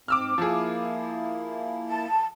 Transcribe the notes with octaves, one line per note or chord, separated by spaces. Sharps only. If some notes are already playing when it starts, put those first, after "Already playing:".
G#2 C4 D6 E6 F6
F3 A#3 E4 G#4
A5